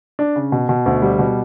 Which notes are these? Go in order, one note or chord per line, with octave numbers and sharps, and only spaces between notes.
D4
C#3
B2
B2
D2
G3
B2